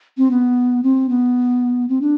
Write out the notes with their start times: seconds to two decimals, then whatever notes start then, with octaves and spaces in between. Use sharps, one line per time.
0.17 C4
0.31 B3
0.83 C4
1.09 B3
1.89 C4
2.01 D4